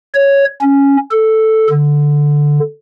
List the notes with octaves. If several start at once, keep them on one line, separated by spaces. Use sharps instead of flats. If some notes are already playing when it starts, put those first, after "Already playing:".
C#5
C#4
A4
D3